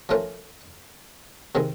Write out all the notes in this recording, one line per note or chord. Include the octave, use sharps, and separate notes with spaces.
F3 A3 C#4 F4 A#4
C3 D#3 G#3